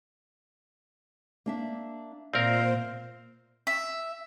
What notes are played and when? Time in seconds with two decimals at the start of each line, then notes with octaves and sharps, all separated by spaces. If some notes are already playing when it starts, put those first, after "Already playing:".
1.46 A#3 D4 E5
2.34 A#2 C4 A#4 C5 D5 E5 F5
3.67 E5